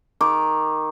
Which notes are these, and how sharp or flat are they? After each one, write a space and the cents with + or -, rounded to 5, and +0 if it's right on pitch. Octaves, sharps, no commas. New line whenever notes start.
D#3 +0 D6 -5